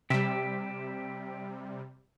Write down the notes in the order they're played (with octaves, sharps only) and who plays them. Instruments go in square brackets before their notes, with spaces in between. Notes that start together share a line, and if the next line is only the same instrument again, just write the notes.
[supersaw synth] C3 G3 [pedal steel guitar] G4 E5